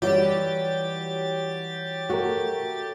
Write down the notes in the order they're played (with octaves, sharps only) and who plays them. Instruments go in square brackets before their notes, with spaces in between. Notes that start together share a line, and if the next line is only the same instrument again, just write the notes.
[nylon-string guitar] E3 G3 [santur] F#3 D#6 [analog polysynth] G4 A6
[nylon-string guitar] A3 [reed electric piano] F#4 A#4